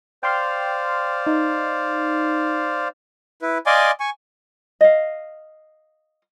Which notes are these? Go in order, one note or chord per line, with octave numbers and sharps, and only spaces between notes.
C5 D5 F5 G5 C6 F6
D#4
E4 B4
D5 D#5 F5 G#5 C6 D6
G#5 C#6
D#5 F5